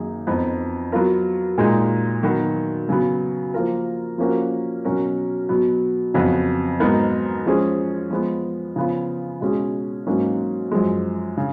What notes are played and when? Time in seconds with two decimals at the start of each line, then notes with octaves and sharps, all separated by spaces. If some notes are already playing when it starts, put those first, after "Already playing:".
Already playing: F#2 D#3 A#3 D#4 G#4
0.27 F2 F3 B3 D#4
0.92 F#3 B3 F4 A#4
1.58 A#2 G#3 D#4
2.23 D#3 F#3 B3 F#4
2.89 C#3 F#3 B3
3.54 F3 A#3 F4 A#4
4.18 F3 A#3 C#4 F#4 A#4
4.85 B2 F#3 C#4 F#4 A#4
5.49 B2 F#3 B3
6.14 F2 C#3 F#3 B3 F#4
6.80 G#2 F#3 B3 D#4 A#4
7.46 F3 G#3 C#4 G#4
8.11 F3 G#3 B3
8.76 C#3 F3 B3 F4
9.41 B2 G#3 C#4 G#4
10.07 G#2 F#3 A#3 C#4
10.72 F#2 F3 G#3
11.37 C#3